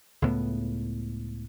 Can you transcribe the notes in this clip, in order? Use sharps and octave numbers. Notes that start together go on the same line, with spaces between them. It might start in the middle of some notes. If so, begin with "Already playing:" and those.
C#2 A2 B3